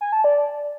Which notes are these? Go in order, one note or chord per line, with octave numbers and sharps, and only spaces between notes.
G#5
A5
D5